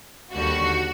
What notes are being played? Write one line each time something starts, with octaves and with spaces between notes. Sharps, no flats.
D#2 D3 G3 F#4